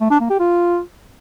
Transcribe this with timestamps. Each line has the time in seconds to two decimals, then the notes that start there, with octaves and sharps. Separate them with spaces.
0.01 A3
0.11 D4
0.20 A#3
0.30 G4
0.40 F4